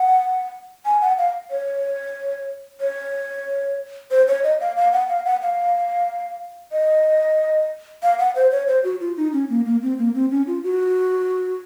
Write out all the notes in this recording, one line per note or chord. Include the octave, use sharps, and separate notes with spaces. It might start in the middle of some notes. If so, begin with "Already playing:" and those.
Already playing: F#5
G#5
F#5
F5
C#5
C#5
C5
C#5
D#5
F5
F5
F#5
F5
F#5
F5
D#5
F5
F#5
C5
C#5
C5
F#4
F4
D#4
C#4
A#3
A#3
C4
A#3
C4
C#4
F4
F#4